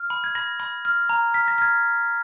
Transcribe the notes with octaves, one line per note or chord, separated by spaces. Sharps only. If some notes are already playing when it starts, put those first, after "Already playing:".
Already playing: F6
B5
G#6
B5 A#6
B5
F6
A#5
F6 B6
A#6
F6 G#6